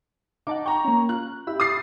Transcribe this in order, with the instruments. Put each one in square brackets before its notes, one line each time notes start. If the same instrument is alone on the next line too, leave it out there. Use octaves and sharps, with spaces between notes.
[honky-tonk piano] D#4 [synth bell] F#5 A5 D6
[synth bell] G5 [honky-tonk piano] A#5 C#6
[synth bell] A#3 C#4
[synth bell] F4 [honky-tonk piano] F#6
[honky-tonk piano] E4 [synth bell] G4 B5 E6
[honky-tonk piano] D#6 A6 C7